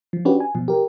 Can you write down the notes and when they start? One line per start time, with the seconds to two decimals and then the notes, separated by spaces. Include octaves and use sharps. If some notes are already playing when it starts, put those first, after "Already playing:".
0.13 F3
0.25 C#4 D4 F#4 G4 B4
0.40 G#5
0.55 B2 F3
0.68 G4 A#4